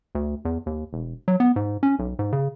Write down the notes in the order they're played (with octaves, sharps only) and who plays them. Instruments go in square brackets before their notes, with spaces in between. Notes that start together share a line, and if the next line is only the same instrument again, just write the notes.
[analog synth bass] D2
E2
D#2
E1
F#3
B3
G#2
C#4
B1
G#2
C#3